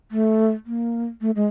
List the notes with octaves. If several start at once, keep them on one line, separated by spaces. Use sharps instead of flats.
A3
A#3
A3
G#3